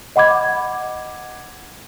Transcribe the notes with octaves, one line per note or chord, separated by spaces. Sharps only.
D#5 F#5 B5 D6 G#6